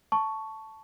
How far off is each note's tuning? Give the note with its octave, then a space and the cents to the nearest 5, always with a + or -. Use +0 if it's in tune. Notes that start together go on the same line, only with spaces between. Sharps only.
A5 +0 C#6 +5